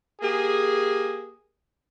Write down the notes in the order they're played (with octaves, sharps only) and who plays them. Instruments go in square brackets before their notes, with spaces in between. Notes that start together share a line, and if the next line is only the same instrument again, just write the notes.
[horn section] A#3 G4 G#4